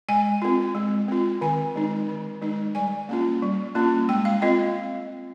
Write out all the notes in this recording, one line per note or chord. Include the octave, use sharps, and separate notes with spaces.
G#3 G#5
C4 F4
G#3
C4 F4
D#3 G#5
G#3 D#4
D#3
G#3 D#4
G3 G#5
A#3 C#4 F4
G3
A#3 C#4 F4
G#3 G5
F5
C4 F4 D#5